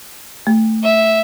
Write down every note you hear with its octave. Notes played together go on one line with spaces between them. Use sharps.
A3
E5